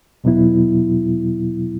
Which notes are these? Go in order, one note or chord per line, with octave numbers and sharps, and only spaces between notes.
E2 B2 F#3 B3 E4